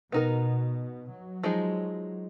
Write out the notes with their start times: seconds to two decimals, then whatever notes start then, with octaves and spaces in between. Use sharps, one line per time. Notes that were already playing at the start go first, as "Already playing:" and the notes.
0.12 B2 B3 D#4 A#4
1.10 F#3
1.43 F3 G#3 D#4 G#4